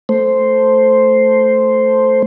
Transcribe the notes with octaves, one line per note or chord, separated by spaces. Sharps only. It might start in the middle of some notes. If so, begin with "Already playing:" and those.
A3 C5